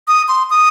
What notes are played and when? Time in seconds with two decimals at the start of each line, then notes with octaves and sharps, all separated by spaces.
0.08 D#6
0.28 C6
0.50 D#6